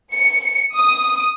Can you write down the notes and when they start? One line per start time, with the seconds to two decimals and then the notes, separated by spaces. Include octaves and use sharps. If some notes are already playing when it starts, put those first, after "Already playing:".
0.14 C#7
0.77 D#6